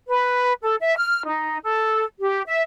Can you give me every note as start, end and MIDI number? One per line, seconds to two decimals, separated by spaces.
0.08 0.52 71
0.62 0.76 69
0.80 0.94 76
0.96 1.21 89
1.25 1.58 63
1.64 2.04 69
2.20 2.43 67
2.46 2.61 76